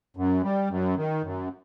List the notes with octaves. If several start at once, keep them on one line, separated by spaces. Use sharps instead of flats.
F#2
G3
F#2
D#3
F#2